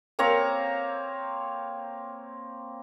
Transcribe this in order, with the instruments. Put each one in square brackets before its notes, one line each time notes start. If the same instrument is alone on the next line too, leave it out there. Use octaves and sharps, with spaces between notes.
[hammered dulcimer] A#3 C4 C#5 A#5